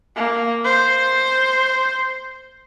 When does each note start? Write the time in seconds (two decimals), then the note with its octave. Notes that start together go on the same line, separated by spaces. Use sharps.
0.16 A#3
0.65 C5